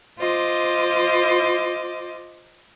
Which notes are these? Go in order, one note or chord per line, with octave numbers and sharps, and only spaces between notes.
F4 C5 D#5 D6